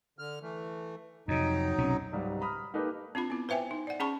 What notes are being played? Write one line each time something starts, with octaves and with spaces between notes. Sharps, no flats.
D3 F6
E3 A3
F2 C3 F#3 D#4
B1 C3 C#4
C#2 G#2 F#3 G3
A#5 B5 D#6 F6
A#3 D#4 G4 A4 B4
C4 D4 F4 B5
B3 E4
B4 C5 E5 G5 G#5
D#4
D5 F#5
C#4 G#4 F#5 A5 B5 C#6